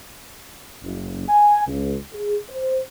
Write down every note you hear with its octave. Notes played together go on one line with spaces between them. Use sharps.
F#1
G#5
C#2
G#4
C5